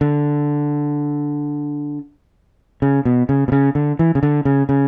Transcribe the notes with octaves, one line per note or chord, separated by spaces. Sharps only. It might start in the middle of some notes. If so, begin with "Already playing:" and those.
D3
C#3
B2
C#3
B2
C#3
D3
E3
C#3
D3
C#3
C#3